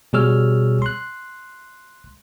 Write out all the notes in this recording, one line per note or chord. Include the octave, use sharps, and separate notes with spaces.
B2 G3 G#4 C#5 E6 F6
C6 F#6